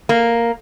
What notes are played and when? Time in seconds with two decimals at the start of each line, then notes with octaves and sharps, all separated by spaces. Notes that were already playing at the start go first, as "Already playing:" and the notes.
0.09 A#3